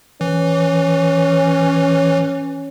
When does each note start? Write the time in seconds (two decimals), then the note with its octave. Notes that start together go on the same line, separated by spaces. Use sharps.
0.21 E3 C#4